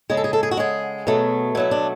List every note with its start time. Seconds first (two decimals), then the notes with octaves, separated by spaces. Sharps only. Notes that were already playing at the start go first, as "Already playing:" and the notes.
0.10 C#3 G#3 G#4
0.17 A4
0.24 G#4
0.33 A4
0.43 G#4
0.51 F#4
0.57 C#3 G#3 G#4
1.07 B2 F#3 A3
1.55 B2 F#3 A3 E4
1.71 D4